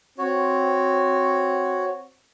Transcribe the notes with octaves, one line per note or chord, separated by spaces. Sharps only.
C4 F#4 C#5